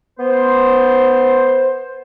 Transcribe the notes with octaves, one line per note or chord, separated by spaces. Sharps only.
B3 C5